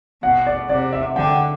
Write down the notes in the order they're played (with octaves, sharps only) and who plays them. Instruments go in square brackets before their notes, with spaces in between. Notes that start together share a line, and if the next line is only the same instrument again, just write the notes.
[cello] B2 [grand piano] F#5
[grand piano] D5
[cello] C3 [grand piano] D5
[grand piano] E5
[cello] D3 [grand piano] G5